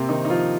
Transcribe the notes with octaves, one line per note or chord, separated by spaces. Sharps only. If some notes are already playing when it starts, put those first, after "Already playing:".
Already playing: C3 A#3 C4
D#3 D#4
D#4
F3 F4